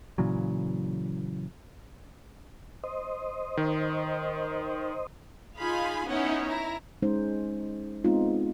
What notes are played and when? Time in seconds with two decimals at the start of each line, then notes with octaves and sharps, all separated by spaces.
0.18 A#2 C#3 E3 F#3
2.84 C5 D#5
3.57 D#3
5.59 D#4 F4 G#4 F5 G#5 B5
6.07 B3 C#4 D#4 E4 C#5 F#5
6.44 E4 A#5
7.02 G#3 C#4 D#4 C5
8.04 G#3 B3 C4 D#4 F4